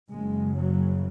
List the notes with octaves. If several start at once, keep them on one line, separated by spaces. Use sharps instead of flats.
F#1 F#2 C#3 G#3
F#3